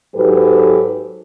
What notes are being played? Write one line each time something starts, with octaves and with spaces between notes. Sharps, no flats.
G#2 F#3 G4 A4 B4